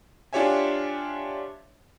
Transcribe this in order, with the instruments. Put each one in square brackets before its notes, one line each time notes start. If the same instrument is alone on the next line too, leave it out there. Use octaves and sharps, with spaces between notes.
[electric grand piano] D4 F4 G4 C#5 E5 G#5